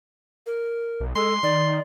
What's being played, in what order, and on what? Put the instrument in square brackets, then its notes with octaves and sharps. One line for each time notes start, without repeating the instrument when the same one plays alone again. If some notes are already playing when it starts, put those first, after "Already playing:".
[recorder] A#4
[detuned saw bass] B1
[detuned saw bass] G#3 [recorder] A4 [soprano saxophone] C6
[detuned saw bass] D#3 [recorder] D5